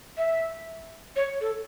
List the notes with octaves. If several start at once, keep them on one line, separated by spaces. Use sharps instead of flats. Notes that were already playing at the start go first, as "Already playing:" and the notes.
E5
C#5
A4